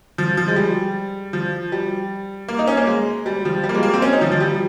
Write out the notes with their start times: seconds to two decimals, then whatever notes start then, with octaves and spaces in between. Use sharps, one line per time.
0.18 F3
0.37 F3
0.48 G#3
0.56 G3
1.33 F3
1.72 G3
2.48 A#3
2.59 D#4
2.68 C#4
2.77 A#3
2.87 G#3
3.26 G3
3.45 F3
3.64 G3
3.69 A#3
3.74 G#3
3.83 A#3
3.94 C4
4.02 C#4
4.13 D#4
4.21 F3
4.32 F3
4.40 G3